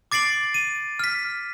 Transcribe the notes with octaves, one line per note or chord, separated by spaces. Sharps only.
D6 A6 C7 D7 F#7
D#7
F6 B6